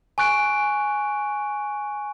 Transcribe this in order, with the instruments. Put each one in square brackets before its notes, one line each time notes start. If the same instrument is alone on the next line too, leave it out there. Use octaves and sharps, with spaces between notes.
[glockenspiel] G#5 C#6 F#6 D7